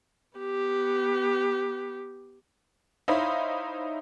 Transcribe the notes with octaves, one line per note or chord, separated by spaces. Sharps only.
B3 G4
D#4 E4 C5 C#5 F5 B5